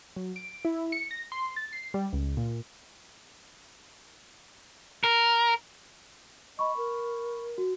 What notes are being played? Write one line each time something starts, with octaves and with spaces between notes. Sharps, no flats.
F#3
D7
E4
C#7
A#6
C6
A6
C7
G3
C#2
A#2
A#4
D#5 B5 C#6
A#4
F#4